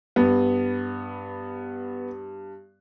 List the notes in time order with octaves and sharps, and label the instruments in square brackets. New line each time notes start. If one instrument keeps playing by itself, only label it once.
[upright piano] G2 [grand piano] B3